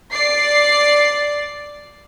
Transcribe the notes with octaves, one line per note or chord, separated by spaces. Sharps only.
D5 C7